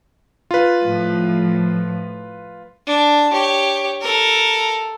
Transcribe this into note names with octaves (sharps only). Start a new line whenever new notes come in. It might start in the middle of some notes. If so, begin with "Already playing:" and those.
F4 B4
A2 F3
D4
G4 C#5
A4 A#4